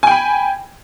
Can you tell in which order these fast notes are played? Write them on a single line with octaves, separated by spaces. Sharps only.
G#5 G5 B5